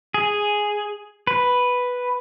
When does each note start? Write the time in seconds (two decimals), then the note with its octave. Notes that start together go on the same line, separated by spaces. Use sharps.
0.14 G#4
1.27 B4